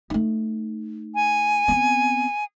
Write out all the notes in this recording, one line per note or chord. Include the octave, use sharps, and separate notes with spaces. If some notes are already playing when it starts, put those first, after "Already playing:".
A3 D#4
G#5
B3 C4